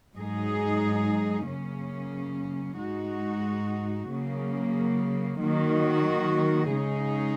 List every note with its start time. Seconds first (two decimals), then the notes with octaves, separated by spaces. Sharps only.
0.15 G#2 F#3 D#4 G#4
1.46 F#2 C#3 A#3 C#4
2.78 G#2 G#3 D#4 F#4
4.09 C#3 F#3 A#3
5.41 D#3 F#3 A#3 F#4
6.72 C#3 G#3 D#4 G#4